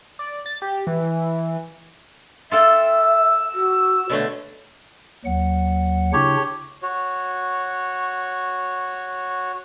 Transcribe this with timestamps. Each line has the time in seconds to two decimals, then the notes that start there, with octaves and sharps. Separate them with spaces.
0.19 D5
0.46 A6
0.62 G4
0.87 E3
2.52 F4 A4 E5 G5 E6
3.55 F#4
4.10 B2 D3 A3 C#5
5.25 D#2 F#3 F#5
6.13 C#3 D4 E4 G4 C#5
6.83 F#4 C#5